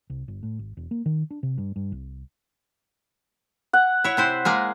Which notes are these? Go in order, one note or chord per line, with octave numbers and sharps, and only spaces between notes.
C2
G1
A2
G#1
E1
A#3
D#3
D4
C3
G2
G2
C2
F#5
E4 C#5
C3 E4 C5
G#3 A#3 G#4